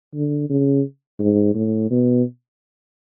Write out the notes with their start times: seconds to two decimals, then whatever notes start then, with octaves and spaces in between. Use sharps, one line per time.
0.14 D3
0.49 C#3
1.19 G#2
1.55 A2
1.91 B2